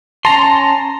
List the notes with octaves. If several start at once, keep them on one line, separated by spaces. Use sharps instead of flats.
C#4 A5 A#5 C6